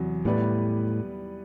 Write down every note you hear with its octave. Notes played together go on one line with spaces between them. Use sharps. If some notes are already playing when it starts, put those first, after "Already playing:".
Already playing: E2 C3 F#3
A2 G3 B3 E4 B4 D5